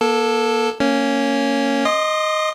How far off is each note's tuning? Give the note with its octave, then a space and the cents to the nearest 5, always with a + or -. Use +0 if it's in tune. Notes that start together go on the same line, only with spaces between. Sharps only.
A#3 +35 A4 +0
A#3 -15 C#4 +0
D#5 +0 C6 +5 D#6 -45